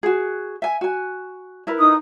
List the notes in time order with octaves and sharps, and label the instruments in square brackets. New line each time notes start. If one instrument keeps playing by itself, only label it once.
[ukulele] F#4 G#4
E5 G#5
F#4 G#5
E4 A#4 B4
[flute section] D#4 D#6